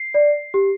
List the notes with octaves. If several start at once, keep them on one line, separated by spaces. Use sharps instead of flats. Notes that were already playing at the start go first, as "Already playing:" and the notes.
Already playing: C7
D5
G4